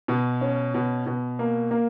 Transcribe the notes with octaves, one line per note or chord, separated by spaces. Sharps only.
B2
C#4
B2
B2
A#3
A#3